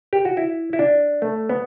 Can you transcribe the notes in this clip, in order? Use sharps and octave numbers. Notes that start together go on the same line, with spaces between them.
G4
F#4
E4
E4
D4
A3
B3